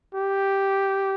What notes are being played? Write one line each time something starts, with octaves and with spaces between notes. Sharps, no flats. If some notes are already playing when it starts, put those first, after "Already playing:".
G4